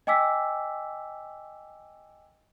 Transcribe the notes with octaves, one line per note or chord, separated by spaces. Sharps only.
D#5 G5 G#5 D6 E6 B6